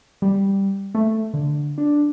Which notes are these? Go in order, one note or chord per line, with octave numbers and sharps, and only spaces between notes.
G3
A3
D3
D4